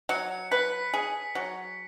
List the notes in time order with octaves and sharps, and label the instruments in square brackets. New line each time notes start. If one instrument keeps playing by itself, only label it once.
[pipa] F#3 [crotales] C#7
[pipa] B4 [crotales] B6
[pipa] G#4
F#3